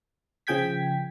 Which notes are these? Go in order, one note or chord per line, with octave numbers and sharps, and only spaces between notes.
C#3 F3 G#4 G5 G#6 B6